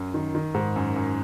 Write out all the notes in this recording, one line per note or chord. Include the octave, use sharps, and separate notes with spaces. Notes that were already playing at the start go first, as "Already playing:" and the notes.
Already playing: F#2
D#3
D#3
G#2
F#2
F#2